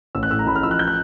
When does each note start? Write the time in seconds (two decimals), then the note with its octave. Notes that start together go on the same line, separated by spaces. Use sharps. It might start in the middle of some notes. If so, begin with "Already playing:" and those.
0.15 A1 E6
0.23 F#6
0.31 A2 E6
0.39 A#5
0.47 A1 B5
0.55 F6
0.63 F3 E6
0.71 F#6
0.79 G6
0.88 F#6